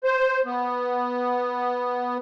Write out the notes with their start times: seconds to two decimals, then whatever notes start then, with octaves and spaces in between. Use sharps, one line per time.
0.04 C5
0.45 B3